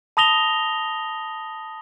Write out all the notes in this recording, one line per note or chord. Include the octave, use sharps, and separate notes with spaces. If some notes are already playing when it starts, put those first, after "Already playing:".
A5 B5 D#6 A#6 F7 G7